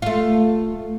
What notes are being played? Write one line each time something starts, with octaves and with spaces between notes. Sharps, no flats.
A3 F4